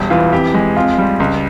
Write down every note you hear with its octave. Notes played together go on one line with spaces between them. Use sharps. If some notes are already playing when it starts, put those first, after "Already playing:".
Already playing: E1 G3
E3 F4
F2 G4
G#3
F2 F4
G3
C#2